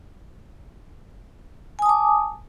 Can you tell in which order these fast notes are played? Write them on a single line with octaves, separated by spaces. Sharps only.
G#5 D#6 A5 D6